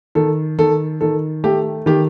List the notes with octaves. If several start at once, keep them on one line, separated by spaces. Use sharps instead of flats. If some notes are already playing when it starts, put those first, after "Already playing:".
D#3 A4
D#3 A4
D#3 A4
A3 G4
D#3 G4